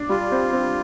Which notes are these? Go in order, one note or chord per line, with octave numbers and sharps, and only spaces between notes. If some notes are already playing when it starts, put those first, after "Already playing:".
Already playing: D4
G3 F4
C4
C4